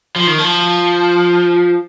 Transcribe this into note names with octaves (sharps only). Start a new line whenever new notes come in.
F3
D#3
F3